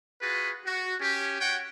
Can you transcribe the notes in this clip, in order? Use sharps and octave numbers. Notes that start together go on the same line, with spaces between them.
F4 F#4 G#4 B4
F#4
C#4 G4
F#4 C#5 F#5 G5